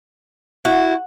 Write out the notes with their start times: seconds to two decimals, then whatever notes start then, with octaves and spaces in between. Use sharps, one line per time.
0.65 E4 F#4